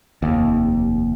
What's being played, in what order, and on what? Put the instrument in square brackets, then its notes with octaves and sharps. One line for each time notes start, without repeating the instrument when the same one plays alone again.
[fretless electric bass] F1 D#2